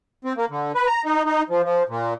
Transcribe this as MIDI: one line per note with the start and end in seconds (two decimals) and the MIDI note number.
0.25 0.33 60
0.37 0.45 58
0.50 0.72 50
0.75 0.87 71
0.87 1.02 82
1.05 1.23 63
1.26 1.42 63
1.50 1.62 53
1.63 1.83 53
1.89 2.14 46